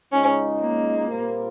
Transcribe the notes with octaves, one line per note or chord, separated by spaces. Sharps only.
C#2 C#3 G#3 C#4 D#4
A#3
A#2 G3 C4 F4 A#4